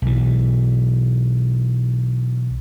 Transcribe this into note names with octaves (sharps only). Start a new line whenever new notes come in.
B1 E3